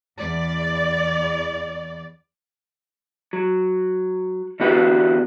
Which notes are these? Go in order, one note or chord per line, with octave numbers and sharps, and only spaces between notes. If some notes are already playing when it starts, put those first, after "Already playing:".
E2 D5
F#3
D3 E3 B3 F#4 G4 B4